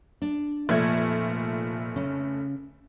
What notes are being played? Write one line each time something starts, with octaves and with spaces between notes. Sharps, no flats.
D4
F1 A#2 F3 A3 G#6
C#3 C#4